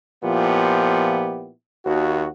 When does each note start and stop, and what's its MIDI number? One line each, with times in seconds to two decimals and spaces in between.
0.24 1.51 46
0.24 1.51 53
0.24 1.51 59
0.24 1.51 64
0.24 1.51 67
1.85 2.27 39
1.85 2.27 66